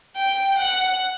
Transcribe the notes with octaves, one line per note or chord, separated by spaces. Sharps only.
G5
F#5